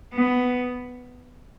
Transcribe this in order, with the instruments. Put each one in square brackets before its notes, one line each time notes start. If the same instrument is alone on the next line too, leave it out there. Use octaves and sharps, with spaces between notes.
[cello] B3